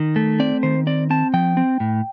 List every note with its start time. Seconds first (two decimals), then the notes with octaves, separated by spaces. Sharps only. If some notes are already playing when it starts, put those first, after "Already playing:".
Already playing: D#3
0.16 A3
0.39 C4 D5
0.63 D#3 C5
0.87 C4 D5
1.10 C4 A5
1.34 F3 G5
1.57 C4
1.80 A2